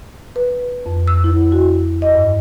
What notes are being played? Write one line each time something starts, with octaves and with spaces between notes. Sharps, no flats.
B4
F2
E6
E4
F#4
D#5
G2